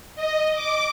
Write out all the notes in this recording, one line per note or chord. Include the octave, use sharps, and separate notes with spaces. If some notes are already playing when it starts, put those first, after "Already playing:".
D#5
D6